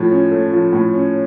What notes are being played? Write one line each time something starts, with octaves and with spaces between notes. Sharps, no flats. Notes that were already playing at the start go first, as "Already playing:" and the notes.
Already playing: A2 F3
C#4
A3
F3
A2
C#4